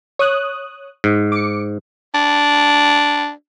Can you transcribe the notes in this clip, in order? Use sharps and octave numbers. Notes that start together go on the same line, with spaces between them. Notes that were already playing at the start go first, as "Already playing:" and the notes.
C#5 D#6 F#6
G#2
D6 C#7
D4